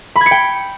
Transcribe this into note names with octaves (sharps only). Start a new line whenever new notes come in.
B5
G#6
C#7
G5